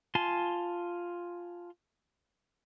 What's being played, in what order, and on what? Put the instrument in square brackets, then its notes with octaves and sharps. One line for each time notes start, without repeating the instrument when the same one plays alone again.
[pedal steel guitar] F4 G#5 A5 C6